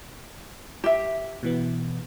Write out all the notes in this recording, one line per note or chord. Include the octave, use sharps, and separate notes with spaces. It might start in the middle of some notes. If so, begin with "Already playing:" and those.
G4 E5
B2 E3 B3